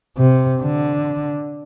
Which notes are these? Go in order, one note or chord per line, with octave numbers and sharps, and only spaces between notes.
C3
D3